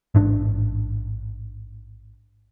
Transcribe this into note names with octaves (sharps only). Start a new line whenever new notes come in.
A1 G#2 D4